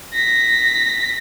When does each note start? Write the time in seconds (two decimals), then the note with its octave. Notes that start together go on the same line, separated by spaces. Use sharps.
0.13 A#6 B6